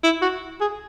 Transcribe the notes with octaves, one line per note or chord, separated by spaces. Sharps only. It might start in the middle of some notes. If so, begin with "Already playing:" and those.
E4
F#4
G#4